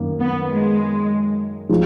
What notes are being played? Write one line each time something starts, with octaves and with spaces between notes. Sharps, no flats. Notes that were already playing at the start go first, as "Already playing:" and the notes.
Already playing: F#2 D#3 A#3
B3
G#3
F3 G#3